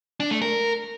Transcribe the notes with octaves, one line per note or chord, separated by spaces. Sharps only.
D4
A3
A#4